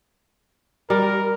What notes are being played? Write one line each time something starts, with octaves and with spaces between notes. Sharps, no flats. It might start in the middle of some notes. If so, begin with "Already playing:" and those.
G3 A#4